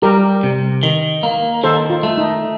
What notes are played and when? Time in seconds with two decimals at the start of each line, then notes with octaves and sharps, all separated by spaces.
0.02 G3 G4 A#4
0.43 C3
0.83 D#3
1.23 A#3
1.63 D#3 A4 C5
1.90 F4
2.03 A3
2.18 D#4